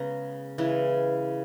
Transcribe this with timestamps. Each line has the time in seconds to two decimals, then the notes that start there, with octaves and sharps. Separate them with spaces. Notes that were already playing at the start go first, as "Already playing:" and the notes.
Already playing: C#3 G#3 B3 A#5
0.58 C#3 E3 G#3